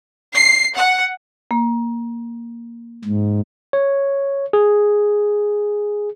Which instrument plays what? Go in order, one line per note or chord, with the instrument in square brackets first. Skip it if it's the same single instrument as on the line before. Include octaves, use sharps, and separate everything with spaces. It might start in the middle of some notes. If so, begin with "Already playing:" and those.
[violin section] C7
F#5
[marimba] A#3
[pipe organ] G#2
[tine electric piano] C#5
G#4